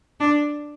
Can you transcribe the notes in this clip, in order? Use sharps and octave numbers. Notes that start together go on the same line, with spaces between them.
D4